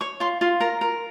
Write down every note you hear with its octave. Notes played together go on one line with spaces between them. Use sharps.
C#5 C#6
F4 C6
F4 C6
A#4 A#5
A#4